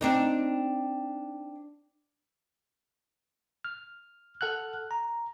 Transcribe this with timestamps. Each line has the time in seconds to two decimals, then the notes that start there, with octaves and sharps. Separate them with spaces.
0.01 C4 D4 D#4
3.65 F6
4.41 A4 F#5 F6 F#6
4.91 A#5